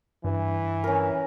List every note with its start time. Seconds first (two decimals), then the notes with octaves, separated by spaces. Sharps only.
0.24 G2 E3
0.84 C#4 A#4